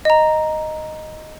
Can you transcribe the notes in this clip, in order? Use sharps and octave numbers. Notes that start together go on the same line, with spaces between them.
D#5 A#5